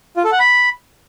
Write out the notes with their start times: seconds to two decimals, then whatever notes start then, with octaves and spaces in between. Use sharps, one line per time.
0.17 F4
0.24 A4
0.32 F#5
0.40 B5